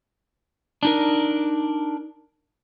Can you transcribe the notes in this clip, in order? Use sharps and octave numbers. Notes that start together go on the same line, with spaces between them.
D4 D#4 A#4